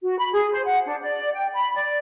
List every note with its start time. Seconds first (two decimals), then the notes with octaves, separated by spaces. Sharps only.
0.02 F#4
0.19 B5
0.32 G#4
0.51 C5
0.65 F#5
0.86 D4
1.01 D5
1.34 G5
1.55 B5
1.75 D5